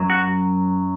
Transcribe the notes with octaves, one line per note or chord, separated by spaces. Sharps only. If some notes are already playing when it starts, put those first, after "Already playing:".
Already playing: F#2 F#3
F#4